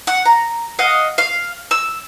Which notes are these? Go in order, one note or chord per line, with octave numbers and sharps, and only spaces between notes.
F#5
A#5
D#5 F5 F#5
F5
E6